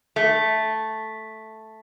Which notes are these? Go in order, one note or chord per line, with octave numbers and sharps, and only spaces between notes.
A3